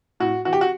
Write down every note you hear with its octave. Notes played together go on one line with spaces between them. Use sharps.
A2 F#4
E3 F#4
G4
F#4